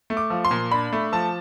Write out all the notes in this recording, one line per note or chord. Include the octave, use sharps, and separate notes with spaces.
A3
D6
F3
C6
A#2
D4 B5
A3
F3 A5